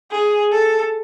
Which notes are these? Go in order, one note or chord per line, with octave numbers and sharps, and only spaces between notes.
G#4
A4